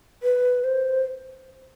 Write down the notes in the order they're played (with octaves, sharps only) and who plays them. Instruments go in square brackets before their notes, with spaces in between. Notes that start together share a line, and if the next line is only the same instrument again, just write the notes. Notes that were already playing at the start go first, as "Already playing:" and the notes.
[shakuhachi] B4
C5